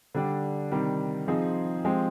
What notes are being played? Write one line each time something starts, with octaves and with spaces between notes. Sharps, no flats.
D3 G3 D4 G4
C3 D#3 G3
F3 C4 D#4 G#4
F3 G#3 C4 G4